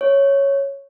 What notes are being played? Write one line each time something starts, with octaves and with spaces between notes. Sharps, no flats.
C#5